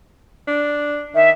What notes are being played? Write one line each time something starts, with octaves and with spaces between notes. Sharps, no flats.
D4
D#3 E5